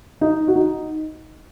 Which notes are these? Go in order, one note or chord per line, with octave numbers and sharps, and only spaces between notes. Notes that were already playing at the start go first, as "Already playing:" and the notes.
D#4
F#4
D#4